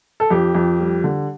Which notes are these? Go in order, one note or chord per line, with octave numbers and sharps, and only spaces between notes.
A4
F2 G4
F2
G3
D3